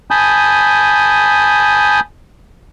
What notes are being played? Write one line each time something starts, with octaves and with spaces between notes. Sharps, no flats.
G#5 A5 B5 D#6 G6